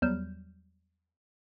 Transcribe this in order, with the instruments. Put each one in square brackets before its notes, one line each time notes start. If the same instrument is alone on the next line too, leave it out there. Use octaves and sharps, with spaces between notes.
[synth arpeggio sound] E2 F#3 G3 F6 G6 E7